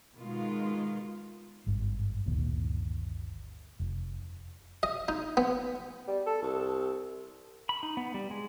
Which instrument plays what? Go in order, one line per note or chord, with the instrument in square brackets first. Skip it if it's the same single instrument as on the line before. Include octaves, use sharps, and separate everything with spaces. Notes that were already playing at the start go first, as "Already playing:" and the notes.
[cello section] B2 D#3 G#3 F4
[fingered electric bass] G#1 G2
G1 D2 A#2 D#3
F1
[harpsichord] D#5
D#4
B3
[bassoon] G3
A4
C2
[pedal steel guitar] B5
D#4
B3
G3
G#3